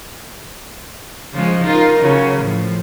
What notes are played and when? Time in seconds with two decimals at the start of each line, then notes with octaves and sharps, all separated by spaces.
1.32 C#3 F3 G#3
1.64 D#4 F4 A#4
2.01 C#3 F#3
2.38 A2 F3